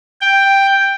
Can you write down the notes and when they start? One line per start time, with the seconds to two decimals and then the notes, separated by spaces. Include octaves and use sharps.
0.21 G5